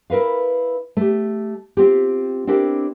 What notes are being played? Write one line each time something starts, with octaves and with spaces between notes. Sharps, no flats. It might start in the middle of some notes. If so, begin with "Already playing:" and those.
E4 A#4 B4 F5
A3 G4
C4 F4 G4
C4 D4 E4 G4 A#4 G5